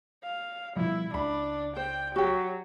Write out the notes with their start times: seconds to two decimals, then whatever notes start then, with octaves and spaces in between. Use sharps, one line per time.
0.24 F5
0.77 B2 F3 G3 E4
1.14 C#2 D4 B5
1.77 C5 G5
2.16 F#3 F#4 G4